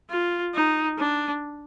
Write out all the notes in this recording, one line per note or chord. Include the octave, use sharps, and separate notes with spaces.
F4
D#4
D4